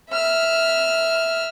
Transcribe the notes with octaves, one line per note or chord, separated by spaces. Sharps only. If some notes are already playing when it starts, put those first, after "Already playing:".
E5 F6